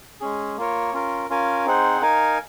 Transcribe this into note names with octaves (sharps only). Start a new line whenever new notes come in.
G#3 C#4 G#4
A#3 F4 A#4 C#5
C#4 F4 A#4
C#4 F4 A#4 F5 G#5
C4 D#4 G#4 C5 F#5
D#4 A#4 F5 G#5